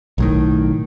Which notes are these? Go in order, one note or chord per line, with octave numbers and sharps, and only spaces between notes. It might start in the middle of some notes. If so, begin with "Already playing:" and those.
B1 A2 D#3